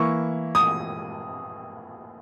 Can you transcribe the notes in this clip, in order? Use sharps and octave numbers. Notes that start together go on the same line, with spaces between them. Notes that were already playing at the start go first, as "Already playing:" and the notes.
Already playing: E3 A#3 E4 C#6
D#6